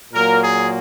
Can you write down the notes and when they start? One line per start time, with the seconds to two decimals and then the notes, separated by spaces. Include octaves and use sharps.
0.14 A#2 F#3 A#3 A#4
0.42 G#4